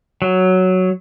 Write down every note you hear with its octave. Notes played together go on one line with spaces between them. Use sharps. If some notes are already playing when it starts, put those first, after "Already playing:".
F#3